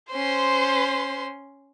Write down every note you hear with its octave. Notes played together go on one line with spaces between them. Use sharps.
C#4 C5 C6